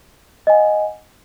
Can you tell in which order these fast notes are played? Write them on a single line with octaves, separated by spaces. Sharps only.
D#5 G#5 F#5